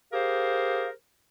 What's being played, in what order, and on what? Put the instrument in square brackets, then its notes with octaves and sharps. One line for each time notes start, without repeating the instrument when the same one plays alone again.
[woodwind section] G4 G#4 A#4 C5 F5